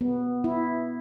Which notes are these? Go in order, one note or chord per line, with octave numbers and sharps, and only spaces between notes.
B3
E4